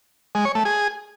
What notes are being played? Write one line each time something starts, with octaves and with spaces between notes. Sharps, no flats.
G#3
C#5
A3
G#4